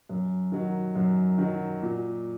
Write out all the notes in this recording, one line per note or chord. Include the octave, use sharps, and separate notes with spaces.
F#2
D#3 F#3
F#2
D#3 F#3
A#2